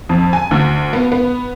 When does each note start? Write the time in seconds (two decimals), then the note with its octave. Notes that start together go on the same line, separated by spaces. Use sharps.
0.09 F2
0.33 G#5
0.51 D2
0.93 B3
1.12 B3